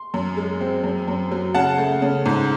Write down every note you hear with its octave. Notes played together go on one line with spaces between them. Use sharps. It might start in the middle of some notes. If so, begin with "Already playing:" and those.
Already playing: C6
F#2
G#3
C4
F#2
F#2
F#3
C#3 F#5 A5
A3
C#3
G#2